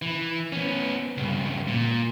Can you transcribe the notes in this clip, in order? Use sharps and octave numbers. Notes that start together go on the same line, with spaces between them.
E3
B3 C#4
C#2 G2
A#2